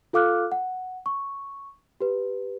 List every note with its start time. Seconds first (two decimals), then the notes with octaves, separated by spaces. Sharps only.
0.13 F4 A4 F5 D6 F6 F#6
0.52 F#5
1.06 C#6
2.01 G4 B4